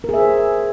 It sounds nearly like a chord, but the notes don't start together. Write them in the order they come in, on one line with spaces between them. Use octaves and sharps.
A#4 G#4 E5 C5